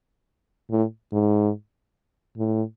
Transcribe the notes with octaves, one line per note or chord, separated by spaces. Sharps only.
A2
G#2
A2